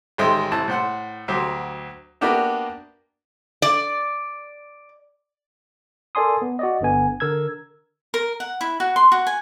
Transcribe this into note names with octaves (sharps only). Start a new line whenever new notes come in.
A1 D#3 G#3 C5 E5 G5
C2 E4 A5
A2 C5 F#5
D2 F#3 G4 C5
A#3 B3 D4 F#4 G4 E5
D5
A4 A#4 D5 G#5 C6 D#6
B3
F#4 D5 D#5
G1 D3 B3 G#5
D3 A#4 E6 G#6
A#4
F#5
E4
F#4
C6
F#4
G#5